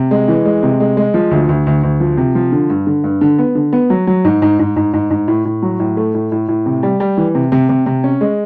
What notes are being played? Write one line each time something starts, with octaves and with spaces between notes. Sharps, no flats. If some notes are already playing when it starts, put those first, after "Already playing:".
Already playing: C3
G#3
E3
G#3
C3
G#3
G#3
F3
D2
D2
D2
D2
F3
C3
F3
D3
G2
D3
G2
D3
B3
D3
B3
F#3
F#3
G#2
G#2
G#2
G#2
G#2
G#2
A2
A2
F#3
A2
A3
A2
A2
A2
C3
G3
G3
E3
C3
C3
C3
C3
C#4
G#3